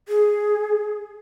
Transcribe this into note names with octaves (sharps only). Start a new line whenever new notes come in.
G#4